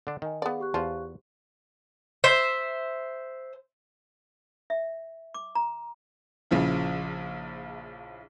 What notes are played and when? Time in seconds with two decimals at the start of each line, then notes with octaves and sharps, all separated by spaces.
0.07 D3 D4
0.22 D#3 D#5 G#5
0.42 B3 G#4 B4 D5 F5
0.60 G4 C#6 F#6
0.74 E2 F3 F4
2.24 C5 E5
4.70 E5
5.34 D6
5.55 A#5
6.51 A#1 C#3 F3 E4